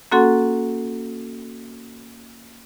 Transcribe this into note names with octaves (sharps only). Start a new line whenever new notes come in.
A#3 C#4 F#4 A4 F#5 C6